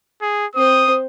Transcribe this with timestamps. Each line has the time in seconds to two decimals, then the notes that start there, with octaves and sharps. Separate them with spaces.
0.21 G#4
0.55 C4 C5 D#6